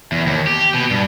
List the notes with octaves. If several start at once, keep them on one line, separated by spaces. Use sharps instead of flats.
E2
D#2
G4
B2
G2